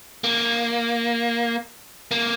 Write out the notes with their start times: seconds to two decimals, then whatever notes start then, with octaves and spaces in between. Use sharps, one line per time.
0.24 A#3
2.11 A#3